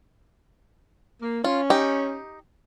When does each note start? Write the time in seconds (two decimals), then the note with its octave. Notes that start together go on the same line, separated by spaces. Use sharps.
1.23 A#3
1.44 C#4 F4
1.70 D#4 G4